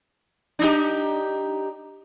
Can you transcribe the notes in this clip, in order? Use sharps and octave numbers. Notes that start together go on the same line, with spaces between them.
D4 D#4 G4